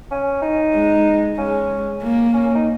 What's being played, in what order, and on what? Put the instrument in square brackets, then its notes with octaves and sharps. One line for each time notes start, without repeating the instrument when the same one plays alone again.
[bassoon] C#4
D#4
[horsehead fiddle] G#3
[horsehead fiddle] G#3 [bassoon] C#4
[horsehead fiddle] A#3
[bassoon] C#4
D#4